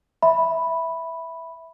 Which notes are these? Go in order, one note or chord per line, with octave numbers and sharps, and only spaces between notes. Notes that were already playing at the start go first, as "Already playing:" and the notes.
E5 B5